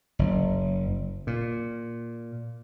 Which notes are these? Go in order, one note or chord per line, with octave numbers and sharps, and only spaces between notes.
F#1
A#2